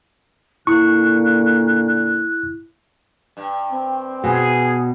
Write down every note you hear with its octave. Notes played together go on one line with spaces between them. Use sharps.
A#2 D3 A#3 E4 C#6 F#6
G2
C4
B2 G#4